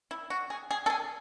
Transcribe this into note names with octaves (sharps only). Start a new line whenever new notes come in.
E4
F#4
G#4
G#4
A4
G#4